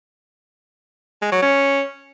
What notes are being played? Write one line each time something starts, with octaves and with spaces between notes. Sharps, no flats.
G#3
F#3
C#4